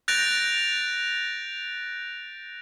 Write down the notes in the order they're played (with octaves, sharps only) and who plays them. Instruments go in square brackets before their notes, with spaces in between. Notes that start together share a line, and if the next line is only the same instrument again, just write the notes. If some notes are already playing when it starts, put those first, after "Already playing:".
[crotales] F#6 G6 A6 A#6 D7 F7